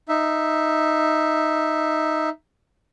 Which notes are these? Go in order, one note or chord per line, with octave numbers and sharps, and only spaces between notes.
D#4 E5